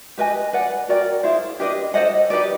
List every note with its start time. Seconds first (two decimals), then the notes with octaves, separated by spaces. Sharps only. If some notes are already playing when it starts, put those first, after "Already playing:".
0.18 G4 B4 D#5 G#5
0.53 B4 D5 F#5
0.88 F#4 A#4 D5 G5
1.23 E4 G#4 C5 F5
1.60 D4 G4 B4 D#5
1.94 A4 C5 D#5 F#5
2.30 D#4 G4 B4 D5